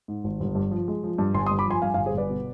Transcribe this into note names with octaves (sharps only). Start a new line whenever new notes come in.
G#2
G#1
G1
G2
F3
G#3
F3
G2
G1 G#5 C6
C6 D#6
G2
B5 D6
F3 G#5 C6
G2 F5 G#5
F5 G#5
G1
G#4 C5
G1 B4 D5
B2